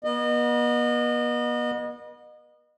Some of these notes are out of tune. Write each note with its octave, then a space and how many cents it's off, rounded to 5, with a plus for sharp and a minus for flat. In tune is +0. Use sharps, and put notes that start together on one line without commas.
B3 -40 D#5 -30